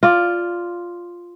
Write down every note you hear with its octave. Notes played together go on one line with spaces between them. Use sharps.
F4 D5